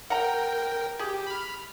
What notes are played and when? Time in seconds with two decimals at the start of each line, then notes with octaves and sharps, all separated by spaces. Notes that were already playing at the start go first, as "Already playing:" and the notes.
0.10 A#4 F#5 G5 A#5
0.99 G4 G#4
1.27 B5 F6